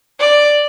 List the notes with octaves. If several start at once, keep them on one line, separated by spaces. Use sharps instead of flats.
D5